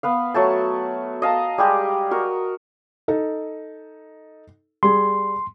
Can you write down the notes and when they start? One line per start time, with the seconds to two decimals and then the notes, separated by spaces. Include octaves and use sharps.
0.03 B3 B4 F5
0.34 F#3 A3 A5
1.22 D#5 F5 A5 A#5
1.58 G3 G#3 G4
2.11 F#4 A#4
3.08 D#4 A4
4.83 G3 G#4 C6